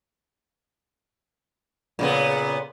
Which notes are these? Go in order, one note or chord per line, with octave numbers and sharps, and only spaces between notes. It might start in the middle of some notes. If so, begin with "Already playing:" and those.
A#2 C#3 B3